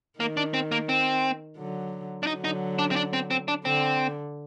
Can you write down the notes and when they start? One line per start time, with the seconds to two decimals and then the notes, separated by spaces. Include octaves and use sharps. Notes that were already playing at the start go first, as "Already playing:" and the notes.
0.20 D#3 A#3
0.37 D4
0.54 C4
0.72 A#3
0.89 C4
1.57 D3 F#3
2.23 D4
2.27 D3 F#3 D#4
2.44 D#4
2.79 D4
2.91 C4
2.96 D4
3.13 C4
3.30 C4
3.48 D4
3.65 D3 C4